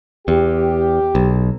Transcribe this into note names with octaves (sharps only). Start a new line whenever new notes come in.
E2 G4
B1